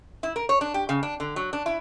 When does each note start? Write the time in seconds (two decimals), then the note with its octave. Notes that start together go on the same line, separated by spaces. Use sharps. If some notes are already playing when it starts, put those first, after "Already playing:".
0.23 E4
0.36 A#4
0.49 C#5
0.61 D4
0.74 G4
0.89 C#3
1.03 D4
1.20 D3
1.36 F#3
1.53 D4
1.66 E4